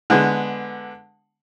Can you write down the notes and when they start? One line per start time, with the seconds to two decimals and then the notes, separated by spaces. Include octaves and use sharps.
0.10 D3 G#3 B3